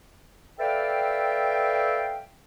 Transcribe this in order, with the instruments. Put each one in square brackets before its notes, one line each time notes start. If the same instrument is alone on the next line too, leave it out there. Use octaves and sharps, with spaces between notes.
[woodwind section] A4 B4 D5 E5 F5 G5